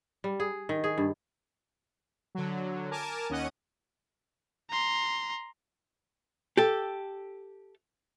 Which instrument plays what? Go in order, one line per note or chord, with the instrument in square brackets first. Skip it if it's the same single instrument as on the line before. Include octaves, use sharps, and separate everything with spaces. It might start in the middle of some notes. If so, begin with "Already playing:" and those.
[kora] G3
G#4
D#3
G#4
G2
[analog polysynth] D3 F#3
A#4 G#5 A5 D6
D#2 C#4 D#5 F#5 D#7
[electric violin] A#5 C6
[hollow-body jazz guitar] G4 A4